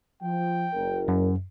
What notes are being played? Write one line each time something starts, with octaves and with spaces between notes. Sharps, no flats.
F3 G5
F#1 A#4
F#2